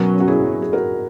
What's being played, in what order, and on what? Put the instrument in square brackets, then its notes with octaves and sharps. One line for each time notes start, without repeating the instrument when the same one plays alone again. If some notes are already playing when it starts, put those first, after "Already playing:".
Already playing: [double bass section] B2 F#3 C#4 [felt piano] F#4 A#4
[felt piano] F#4
E4 G#4
G#4
F#4 A#4